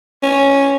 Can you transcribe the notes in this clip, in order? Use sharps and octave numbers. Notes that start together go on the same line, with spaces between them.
C#4